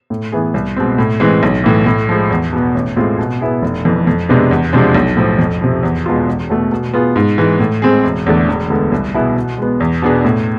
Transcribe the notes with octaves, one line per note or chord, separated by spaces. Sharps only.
A2
E3 B3 E4 G#4
C2
B2 G#3 C4
A2
E3 G#3 C4
B1
A2 E3
A2
F3 G#3
E2
B2 B3
A1
A2 G#3 C4 F4
B2
B3 E4 G#4
F1
F2 E3
F2
C3 G#3 B3 D4
E2
C3 F3 G#3 D4
B1
A2 F3
F2
C3 F3
E2
B2 G#3 B3 F4
E1
E2 B2 A3
B2
B3 F4 G#4
G#2
E3 G#3
A2
G#3 C4 G#4
E1
E2 D3 A3 D4
E1
D2 D3 G#3 B3
C2
B2 B3 E4 G#4
B2
G#3 B3
E2
B2 B3 D4 G#4
A2